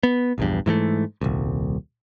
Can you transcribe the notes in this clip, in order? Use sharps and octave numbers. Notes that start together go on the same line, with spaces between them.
B3
A#1 E2 G2
G#2 E3 G#3 A3
D#1 C2